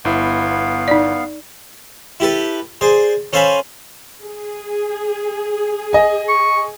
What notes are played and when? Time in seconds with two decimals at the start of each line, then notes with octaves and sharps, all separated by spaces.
0.05 G1 B3 E4 F5
0.88 D#4 D5
2.20 E4 G4 A4 B4
2.81 G#4 C5 D5
3.33 C#4 A4 C5 F5 G#5 B5
4.22 G#4
5.93 D#5 G#5
6.28 C#6